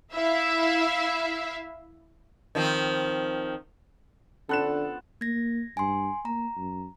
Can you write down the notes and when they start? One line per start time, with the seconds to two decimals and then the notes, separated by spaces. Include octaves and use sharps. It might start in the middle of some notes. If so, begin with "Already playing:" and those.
0.14 E4 E5 F5
2.55 D#3 F3 C4
4.49 D3 F3 B3 C#4 D4 A4 F#6 E7
5.21 A#3 G#6 A#6
5.77 G2 G#5 C6
6.25 A#3 A#5
6.57 F#2